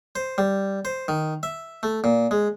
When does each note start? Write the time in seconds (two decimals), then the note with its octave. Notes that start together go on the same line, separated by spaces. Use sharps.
0.16 C5
0.38 G3
0.85 C5
1.08 D#3
1.43 E5
1.83 A3
2.04 A#2
2.31 G#3